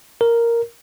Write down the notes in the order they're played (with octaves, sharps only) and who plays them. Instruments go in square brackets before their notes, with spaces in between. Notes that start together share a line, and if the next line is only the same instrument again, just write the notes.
[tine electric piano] A#4